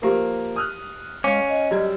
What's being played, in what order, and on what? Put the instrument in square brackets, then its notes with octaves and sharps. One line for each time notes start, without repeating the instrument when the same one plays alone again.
[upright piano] F3 A#3 [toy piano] G4 A#4
[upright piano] D#6 F6 F#6
[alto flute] G#3 [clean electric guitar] C#4 [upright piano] F5 [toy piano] D6
[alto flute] D#5
[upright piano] F#2 G3 G#6